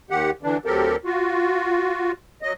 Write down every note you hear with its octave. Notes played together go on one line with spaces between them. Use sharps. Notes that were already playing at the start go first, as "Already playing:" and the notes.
D#2 D#3 G4 F#5
D3 E3 D4
D2 F#3 C4 G4 A4 A#4
F4 F#4
F#3 D#5